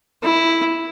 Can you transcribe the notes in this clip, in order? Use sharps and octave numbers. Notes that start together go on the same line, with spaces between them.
E4